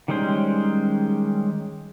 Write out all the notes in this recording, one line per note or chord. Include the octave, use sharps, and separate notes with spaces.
D#3 G3 G#3 C#4 C5